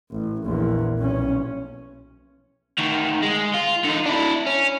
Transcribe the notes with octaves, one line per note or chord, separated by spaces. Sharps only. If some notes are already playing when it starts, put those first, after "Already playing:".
A1
A#1 E2
B1 C#4
D2 D#3
G#3
F4
D3 D#4
D4 E4
C#4